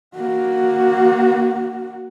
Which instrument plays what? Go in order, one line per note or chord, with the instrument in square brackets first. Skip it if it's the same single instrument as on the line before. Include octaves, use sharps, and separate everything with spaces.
[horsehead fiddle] A#3 F#4